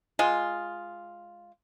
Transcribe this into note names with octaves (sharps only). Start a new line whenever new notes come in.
G#3 F4